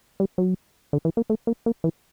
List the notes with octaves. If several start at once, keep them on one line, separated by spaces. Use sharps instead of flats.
G3
F#3
D3
E3
A#3
A3
A#3
A#3
E3